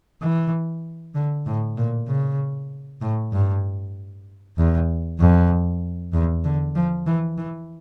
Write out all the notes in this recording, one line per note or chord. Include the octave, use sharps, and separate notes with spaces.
E3
D3
A2
A#2
C#3
A2
G2
E2
F2
E2
D3
F3
E3
E3